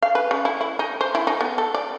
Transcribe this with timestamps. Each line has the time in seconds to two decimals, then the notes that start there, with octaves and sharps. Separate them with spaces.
0.02 F5
0.15 B4
0.31 C#3
0.45 E4
0.61 E4
0.79 D#4
1.01 C5
1.15 E4
1.27 D#4
1.41 B3
1.58 A4
1.74 D5